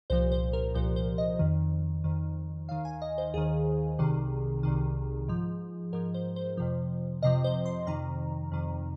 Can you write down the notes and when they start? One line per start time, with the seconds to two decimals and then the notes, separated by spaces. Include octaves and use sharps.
0.10 C2 A#2 F3 C5
0.32 C5
0.53 A#4
0.75 C2 A#2 F3 C5
0.96 C5
1.18 D#5
1.39 F2 D#3
2.04 F2 D#3
2.68 D#2 D#3 F5
2.85 G#5
3.02 D#5
3.18 C5
3.34 D#2 D#3 G#4
3.99 C2 C3 D#3
4.63 C2 C3 D#3
5.28 G#2 F3
5.93 G#2 F3 A#4
6.14 C5
6.36 C5
6.57 F2 C3 F3
7.22 F2 C3 F3 D#5
7.44 C5
7.65 C6
7.87 F2 C3 D#3 A#5
8.52 F2 C3 D#3